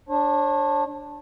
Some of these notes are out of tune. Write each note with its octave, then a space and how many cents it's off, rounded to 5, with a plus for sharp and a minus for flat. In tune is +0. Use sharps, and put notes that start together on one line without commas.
D4 +0 C#5 -40